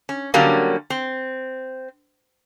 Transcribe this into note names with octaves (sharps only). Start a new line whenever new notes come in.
C#4
D3 F#3 G3 A#3 C#4
C4